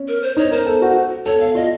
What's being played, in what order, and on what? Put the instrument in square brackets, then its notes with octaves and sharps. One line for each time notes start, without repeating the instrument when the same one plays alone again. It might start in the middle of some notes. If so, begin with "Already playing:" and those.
Already playing: [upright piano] C#4
[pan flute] A#4
C5
[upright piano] D#4 [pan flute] C#5
[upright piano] A#4 [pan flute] C5
[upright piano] A4
F#4
[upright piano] A4 [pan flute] C#5
[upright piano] A4 [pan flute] F5
[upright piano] F4 [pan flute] D#5